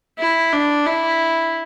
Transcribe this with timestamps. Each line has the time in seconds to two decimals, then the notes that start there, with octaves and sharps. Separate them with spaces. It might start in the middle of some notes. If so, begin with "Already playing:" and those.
0.19 E4
0.53 D4
0.85 E4